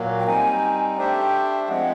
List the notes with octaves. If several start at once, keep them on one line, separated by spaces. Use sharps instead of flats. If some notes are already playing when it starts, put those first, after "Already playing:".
Already playing: A#2 F#3 A#3
G5
G3 C4 D#4 G#5
A3 D4 G4 C5 E5 G5
F3 G#3 C4 F#5